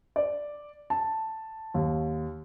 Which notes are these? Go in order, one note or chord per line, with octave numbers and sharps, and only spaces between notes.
D5
A5
D#2